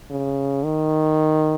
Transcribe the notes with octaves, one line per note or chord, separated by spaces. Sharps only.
C#3
D#3